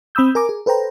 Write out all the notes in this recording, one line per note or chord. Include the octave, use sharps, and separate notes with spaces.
C4 B5 D#6 E6 G6
A#4 G#5 A#5 D6
G#4
A4 B4 C5 G5 A#5